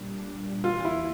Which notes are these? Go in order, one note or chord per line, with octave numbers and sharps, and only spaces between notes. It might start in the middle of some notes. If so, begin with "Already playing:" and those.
Already playing: A#2 G3 D4
E2 E3 A#3 F4
E4